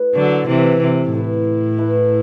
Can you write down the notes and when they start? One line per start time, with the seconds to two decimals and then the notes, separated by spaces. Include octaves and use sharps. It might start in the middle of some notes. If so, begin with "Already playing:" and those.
Already playing: A3 E4 B4
0.15 D3 F#3
0.47 C3 E3 A3 E4 B4
0.80 C3
1.13 A2 A3 E4 B4
1.78 A3 E4 B4